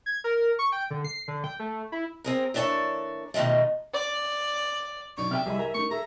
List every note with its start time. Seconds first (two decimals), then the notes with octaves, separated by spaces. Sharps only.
0.06 G#6
0.24 A#4
0.59 C#6
0.72 G5
0.91 D3
1.04 C7
1.28 D3
1.44 G5
1.60 A3
1.92 E4
2.24 C4 G#4 A#4
2.54 E3 A#3 D4 A4 C#5 D5
3.34 B2 D#3 F3 G#3 A3
3.94 D5
5.18 B1 D#4 D5 C#6
5.31 C3 A#4 E5 G5 F6
5.46 C2 G3 G#4 D#5 B5
5.59 A#4 G#5 A#5
5.74 A3 D#4 C#6
5.91 G#4 A4 E5 A#5